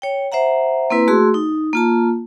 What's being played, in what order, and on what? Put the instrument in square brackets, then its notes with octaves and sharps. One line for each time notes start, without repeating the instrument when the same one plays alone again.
[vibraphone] C#5 G5
C5 E5 F#5 A#5
A#3 C4 E4 B4
A3 F#4 G#4 C6 E6
D#4
A#3 F4 A5